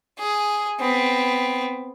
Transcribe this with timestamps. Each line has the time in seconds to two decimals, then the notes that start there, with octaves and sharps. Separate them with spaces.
0.19 G#4
0.80 B3 C4